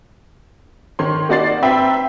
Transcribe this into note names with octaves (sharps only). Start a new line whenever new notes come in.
D#3 C#5 C6
A#3 D#4 F#4 D5 A6 C7
C4 B4 E5 G5 A#5 B5